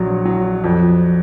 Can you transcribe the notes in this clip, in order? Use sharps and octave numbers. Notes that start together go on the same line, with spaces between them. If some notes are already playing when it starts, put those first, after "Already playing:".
Already playing: A#1 F#3
F#3
F2